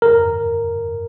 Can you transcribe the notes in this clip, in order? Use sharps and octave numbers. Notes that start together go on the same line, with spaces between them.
A#4